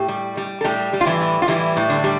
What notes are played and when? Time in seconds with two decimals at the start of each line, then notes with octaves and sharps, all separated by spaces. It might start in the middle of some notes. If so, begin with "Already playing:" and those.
Already playing: A2 G4
0.08 G3
0.37 G3
0.61 A4
0.64 A2 G3 G4
0.93 G3
1.01 F4
1.06 E3 E4
1.21 A2
1.42 F4
1.48 E3 G3 E4
1.77 A2
1.90 D3 D4
2.04 G3